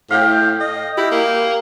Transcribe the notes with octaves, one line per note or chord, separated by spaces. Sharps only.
A2 F5 G5
D#5
E4 G4
A#3